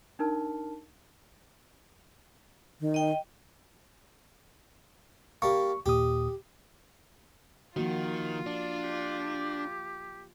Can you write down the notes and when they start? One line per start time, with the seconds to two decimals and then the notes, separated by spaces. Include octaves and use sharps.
0.19 D4 D#4 A#4 A5 F6
2.80 D#3
2.94 D#5 G5
5.42 G3 A#3 C#6
5.86 D#2 A#2 G4 D#6
7.76 D#3 F3 A#3 F4 F#4
8.46 D4
8.83 G4